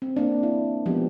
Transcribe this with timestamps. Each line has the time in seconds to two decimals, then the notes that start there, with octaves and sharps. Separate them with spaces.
0.02 C4
0.16 A#3 D4
0.43 E4
0.86 F3 G#3 B3 G4